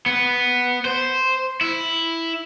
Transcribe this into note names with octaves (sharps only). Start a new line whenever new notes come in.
B3
C5
E4